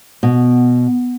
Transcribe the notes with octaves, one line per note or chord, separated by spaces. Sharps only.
B2